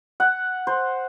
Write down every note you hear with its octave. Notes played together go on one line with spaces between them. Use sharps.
F#5
C5